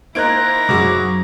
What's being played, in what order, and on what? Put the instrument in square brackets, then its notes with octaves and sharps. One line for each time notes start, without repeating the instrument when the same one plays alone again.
[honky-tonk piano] A#3 D#4 C5 [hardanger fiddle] E4 A#5 [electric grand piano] F#6 G#6 D7
[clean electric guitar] C2 F#2 [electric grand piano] F#4 G#4 D6